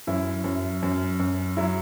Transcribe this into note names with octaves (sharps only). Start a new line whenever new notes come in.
F#2 E4
F#2
F#2
F#2
F#3 E4